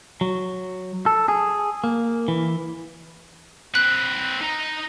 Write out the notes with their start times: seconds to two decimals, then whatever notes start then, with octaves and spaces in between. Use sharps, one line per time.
0.21 F#3
1.06 A4
1.28 G#4
1.84 A#3
2.28 E3
3.75 C4 B4 F#6
4.41 D#4 A#5